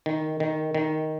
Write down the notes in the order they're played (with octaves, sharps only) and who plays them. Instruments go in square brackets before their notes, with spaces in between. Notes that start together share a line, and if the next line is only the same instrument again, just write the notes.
[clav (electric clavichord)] D#3
D#3
D#3